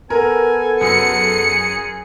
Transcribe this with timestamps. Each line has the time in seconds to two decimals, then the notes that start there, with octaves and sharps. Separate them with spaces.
0.10 B3 A4 A#4 G#5
0.81 F#2 G#4 C#7